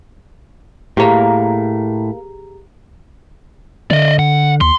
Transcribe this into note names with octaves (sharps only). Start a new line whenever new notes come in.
A2 A#3 G4 G#4 C#5 A#5
D3 D5 D#5
F#5
D#2 C6